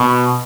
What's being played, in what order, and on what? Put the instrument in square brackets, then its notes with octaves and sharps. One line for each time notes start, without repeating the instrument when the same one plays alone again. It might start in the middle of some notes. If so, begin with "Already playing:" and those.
Already playing: [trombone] B2